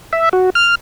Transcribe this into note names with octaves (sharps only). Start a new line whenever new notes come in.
E5
F#4
F6